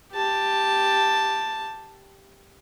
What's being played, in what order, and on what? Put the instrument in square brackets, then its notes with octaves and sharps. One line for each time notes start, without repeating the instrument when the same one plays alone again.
[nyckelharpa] G4 A5